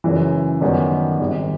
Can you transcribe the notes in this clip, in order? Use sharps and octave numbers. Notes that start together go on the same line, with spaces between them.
F#2 C#3 E3
F#2 D#3 G3 B3
G#1 G#2 D#3 G3